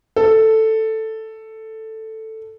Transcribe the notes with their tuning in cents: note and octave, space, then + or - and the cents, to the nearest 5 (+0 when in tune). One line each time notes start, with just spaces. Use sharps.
A4 +5